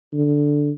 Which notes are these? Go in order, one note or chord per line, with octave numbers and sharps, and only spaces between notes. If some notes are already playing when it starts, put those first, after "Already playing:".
D3